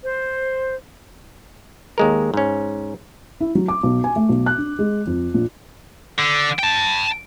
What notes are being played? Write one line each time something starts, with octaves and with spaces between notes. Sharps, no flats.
C5
D#2 G#3 A#4
G#2 C#4
E4
F#3
D6
B1
G#5
A3
B1
F#6
D4
G#3
F2
A#1
D3
G5 A5